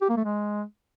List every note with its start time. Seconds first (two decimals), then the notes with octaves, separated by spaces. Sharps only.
0.01 G4
0.09 A#3
0.17 A3
0.25 G#3